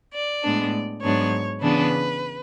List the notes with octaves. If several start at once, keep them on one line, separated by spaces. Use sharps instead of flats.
D5
A2 G#3 B3 D4
G#2 F#3 B3 D4 C#5
C#3 E3 B3 D4 B4